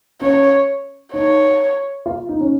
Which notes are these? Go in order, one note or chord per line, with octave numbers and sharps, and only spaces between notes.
C#4 C#5
D#4 C#5
F4
D#4
C#4